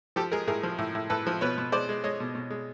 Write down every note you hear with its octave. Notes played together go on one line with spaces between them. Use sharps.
F3 G4 A4
G#3 G#4 A#4
A2 G#4 A#4
F3
A2
A2
A2 A4 B4
F3
B2 B4 C#5
B2
G#3 C5 D5
G#3
G#3 C#5 D#5
B2
B2
G#3